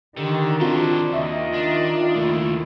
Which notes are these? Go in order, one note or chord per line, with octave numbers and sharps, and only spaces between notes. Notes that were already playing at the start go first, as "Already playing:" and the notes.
D3 D#3 G4
C#3 C4 D4 F4 F#4 C5
D#2 D#3 F4 D#5 E5 C#6
D4
D#2 A3 E4